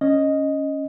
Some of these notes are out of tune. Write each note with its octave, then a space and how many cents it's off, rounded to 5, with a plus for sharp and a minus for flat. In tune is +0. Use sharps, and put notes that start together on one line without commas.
C#4 +0 D#5 +0